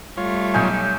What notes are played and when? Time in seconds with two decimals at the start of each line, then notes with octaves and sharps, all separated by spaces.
0.17 G3 A3 F4 C#5
0.54 B1 D#4 G#5